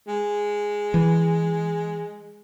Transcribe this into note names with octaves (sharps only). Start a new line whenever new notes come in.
G#3
E3